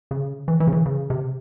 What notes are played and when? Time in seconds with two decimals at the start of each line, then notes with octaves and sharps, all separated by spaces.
0.11 C#3
0.48 E3
0.60 E3
0.67 C#3
0.73 E3
0.86 C#3
1.10 C3